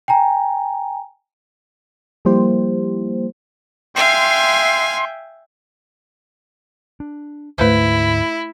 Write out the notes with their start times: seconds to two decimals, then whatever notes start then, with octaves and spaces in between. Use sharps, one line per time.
0.08 G5 G#5 A#5
2.25 F3 G3 A#3 E4 G4 C5
3.96 E5 F5 G5 G#5 C6
7.00 D4
7.58 D2 G#2 A3 E4 B4 C5